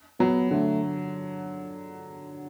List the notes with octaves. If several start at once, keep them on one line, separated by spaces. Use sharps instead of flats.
F#3 B3
D3 A3